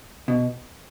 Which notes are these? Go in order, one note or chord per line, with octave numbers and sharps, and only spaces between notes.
B2